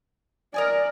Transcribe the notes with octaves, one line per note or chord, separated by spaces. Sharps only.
A#4 D5 D#5 G#5